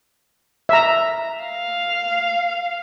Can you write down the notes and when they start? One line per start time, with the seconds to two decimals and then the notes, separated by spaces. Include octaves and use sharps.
0.69 E5 A#5
1.43 F5